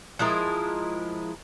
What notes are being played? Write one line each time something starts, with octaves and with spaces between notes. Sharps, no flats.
F3 G#3 E4 A#4